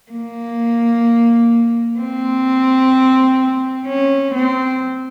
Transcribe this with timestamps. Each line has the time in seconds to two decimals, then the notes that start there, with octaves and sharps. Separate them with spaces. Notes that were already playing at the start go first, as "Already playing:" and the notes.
0.12 A#3
2.00 C4
3.87 C#4
4.35 C4